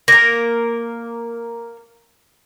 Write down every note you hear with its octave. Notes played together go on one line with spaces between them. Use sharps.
A#3 A#4 A#6